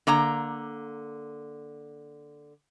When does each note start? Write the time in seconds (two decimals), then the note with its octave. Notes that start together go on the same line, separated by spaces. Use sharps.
0.07 D3 A#3 A#5